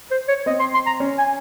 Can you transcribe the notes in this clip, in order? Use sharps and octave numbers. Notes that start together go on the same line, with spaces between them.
C5
C#5
C4 D#5
C6
C6
A#5
C#4
G#5